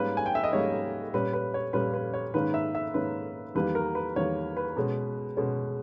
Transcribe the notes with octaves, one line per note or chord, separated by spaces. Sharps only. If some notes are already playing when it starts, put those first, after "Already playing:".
Already playing: G#2 G3 A#3 C#4 B4
G#5
G5
E5
D#5
G#2 G3 A#3 C#4 C#5
A#2 G3 C#4 B4
B4
C#5
A#2 G3 C#4 B4
B4
C#5
G#2 D#3 A#3 C#4 B4
E5
E5
G#2 D#3 A#3 C#4 B4
E2 D#3 G3 A#3 B4
A#4
B4
E2 D#3 G3 A#3 C#5
B4
B2 G#3 C#4
B2 G#3 C#4